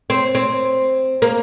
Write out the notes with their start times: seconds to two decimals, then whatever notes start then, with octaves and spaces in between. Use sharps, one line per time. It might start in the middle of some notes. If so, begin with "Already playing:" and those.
0.10 C4
0.35 C4
1.22 A#3